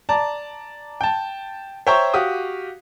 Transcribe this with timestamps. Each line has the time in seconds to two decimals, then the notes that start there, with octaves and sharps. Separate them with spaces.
0.09 D5 A5 A#5
1.01 G5 A5
1.87 C5 C#5 E5 G5 A#5 C#6
2.14 F#4 G4 F5 D#6